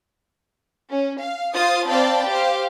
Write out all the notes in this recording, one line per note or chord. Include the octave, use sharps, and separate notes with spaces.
C#4
F5
F4 C5 D#6 A6
C4 D5 F5 G5 A5 B5
G4 C5 F5